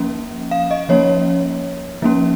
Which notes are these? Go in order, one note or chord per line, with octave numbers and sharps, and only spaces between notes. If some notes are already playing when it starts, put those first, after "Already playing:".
Already playing: F3 A#3 C#4
F5
D#5
F3 A#3 C#4 C#5
F3 A#3 C#4